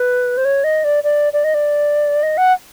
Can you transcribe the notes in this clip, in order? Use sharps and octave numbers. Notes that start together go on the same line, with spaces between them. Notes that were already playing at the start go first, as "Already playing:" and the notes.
Already playing: B4
C5
C#5
D#5
D5
D5
D5
D#5
D5
D#5
F#5